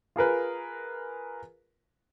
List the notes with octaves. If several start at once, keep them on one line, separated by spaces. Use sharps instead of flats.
F4 G#4 A#4 B4